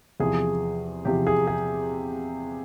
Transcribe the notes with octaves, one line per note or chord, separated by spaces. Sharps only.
E2 C3 F3 G#4
E2 C3 F3 G4
G#4
G#4